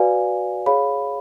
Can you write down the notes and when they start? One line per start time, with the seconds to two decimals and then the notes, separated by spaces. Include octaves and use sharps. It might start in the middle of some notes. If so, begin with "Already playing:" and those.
Already playing: F#4 B4 D5 F5 G#5
0.66 G#4 C#5 F5 B5